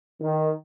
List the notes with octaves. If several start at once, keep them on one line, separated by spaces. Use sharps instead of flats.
D#3